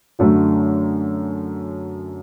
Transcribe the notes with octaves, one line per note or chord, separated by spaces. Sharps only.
F#2 D3 F#3 A3